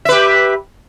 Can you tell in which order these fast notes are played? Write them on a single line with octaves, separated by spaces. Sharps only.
E5 B4 G4